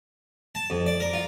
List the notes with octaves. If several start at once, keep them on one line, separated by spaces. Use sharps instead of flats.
A5
F2
D5
A#4
F4